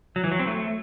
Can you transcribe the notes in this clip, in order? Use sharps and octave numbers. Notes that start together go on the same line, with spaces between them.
F#3
E3
F#3
C4
A3